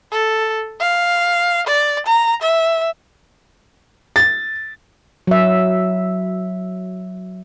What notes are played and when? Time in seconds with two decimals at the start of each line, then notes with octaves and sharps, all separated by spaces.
0.12 A4
0.80 F5
1.67 D5
2.06 A#5
2.42 E5
4.16 A6
5.27 F#3 E5